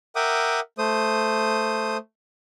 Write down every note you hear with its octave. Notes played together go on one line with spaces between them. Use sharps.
A#4 E5 F#5 G5 D6 D#6
A3 C5 D#6